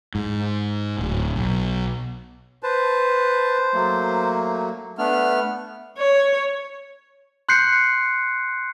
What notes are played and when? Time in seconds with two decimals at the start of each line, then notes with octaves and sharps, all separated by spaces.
0.15 G#2
0.99 D1
1.36 B1
2.63 B4 C5 A5
3.74 F#3 A3 A#3
4.98 A3 B3 D4 F6
5.98 C#5
7.49 C6 F#6 G6 C7 C#7